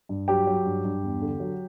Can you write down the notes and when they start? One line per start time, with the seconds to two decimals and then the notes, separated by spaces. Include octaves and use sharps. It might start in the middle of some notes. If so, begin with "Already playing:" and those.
0.09 G2
0.28 F#3 G4 G5
0.47 F#3
0.66 G2
0.85 G2
1.03 E2
1.22 D3
1.40 F#3